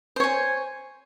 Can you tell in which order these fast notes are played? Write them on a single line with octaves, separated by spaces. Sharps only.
C5 C#5 G#5